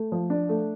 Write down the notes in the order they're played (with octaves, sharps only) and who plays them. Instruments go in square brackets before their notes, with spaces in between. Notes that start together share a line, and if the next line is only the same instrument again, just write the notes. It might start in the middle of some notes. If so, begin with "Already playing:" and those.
Already playing: [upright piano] A3
F3
D4
A3